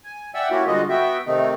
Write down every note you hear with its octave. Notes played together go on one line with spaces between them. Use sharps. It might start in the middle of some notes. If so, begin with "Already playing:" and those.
G#5
D5 E5 F#5 G5 E6
A#3 C#4 E4 F#4 G4
D3 G3 G#3 F4 F#4 D#5
B3 F#4 E5 G5
C3 D#3 A3 C4 D#4